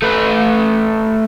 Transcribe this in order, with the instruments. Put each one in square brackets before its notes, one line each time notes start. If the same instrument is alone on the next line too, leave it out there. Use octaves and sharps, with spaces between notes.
[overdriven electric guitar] A3 B4